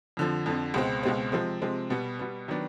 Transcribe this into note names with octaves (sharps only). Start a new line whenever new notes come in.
F2 D3 F3
F2 D3 F3
C#2 B2 G#3 C4
C#2 B2 G#3 C4
C3 F3 G#3 C4
C3 F3 G#3 C4
B2 G3 B3
B2 G3 B3
D#3 F#3 B3 D4